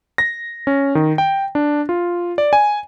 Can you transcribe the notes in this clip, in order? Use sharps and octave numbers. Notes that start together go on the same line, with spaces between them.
A#6
C#4
D#3
G5
D4
F4
D5
G#5